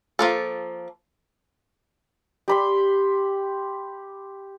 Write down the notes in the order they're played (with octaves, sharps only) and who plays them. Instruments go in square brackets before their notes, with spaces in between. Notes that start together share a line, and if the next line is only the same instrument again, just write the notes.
[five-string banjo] F3 A#3 A4
[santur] G4 B5 C6